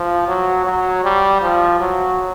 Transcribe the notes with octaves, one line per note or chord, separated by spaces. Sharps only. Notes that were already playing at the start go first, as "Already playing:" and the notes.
Already playing: F3
F#3
F#3
G3
F3
F#3